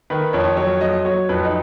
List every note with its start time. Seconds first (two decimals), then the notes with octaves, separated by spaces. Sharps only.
0.10 D#3 B4
0.33 F2 C#5
0.57 F#3 C#5
0.81 F#3 D#5
1.05 F#3 C#5
1.29 F2 B4
1.45 D#4